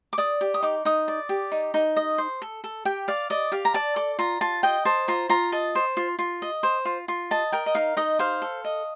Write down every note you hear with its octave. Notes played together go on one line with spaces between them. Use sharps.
D6
D5 D#6
G4
D#6
D#4 D6
D#4 D#6
D5
G4
D#4
D#4
D#5
C5
A4
A4
G4 G5
D5 F5
D5 D#5
G4 F5
A#5
D5 A5
A4 D6
F4 A#5
F4 A5
D#5 G5
C5 A5
F4 A#5
F4 A#5
D#5 A5
C5
F4
F4
D#5
C5
F4
F4
D#5 A5
A#4 G5
D#5
D#4 F5
D#4 D#5
C5 F5
A4
D#5